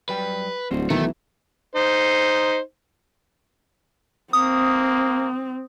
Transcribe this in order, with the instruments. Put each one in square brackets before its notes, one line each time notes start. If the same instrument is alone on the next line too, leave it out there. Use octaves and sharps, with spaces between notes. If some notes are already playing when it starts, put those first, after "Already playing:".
[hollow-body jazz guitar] F#2 G3 G5 [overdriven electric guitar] B4
[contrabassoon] D1 [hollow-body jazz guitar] G3 F#4 C5
[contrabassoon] B1 [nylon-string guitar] D#3 [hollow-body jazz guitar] E3 E4 [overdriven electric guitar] A3
[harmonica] D#4 C5
[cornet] A#3 [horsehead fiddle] C4 [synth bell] D#6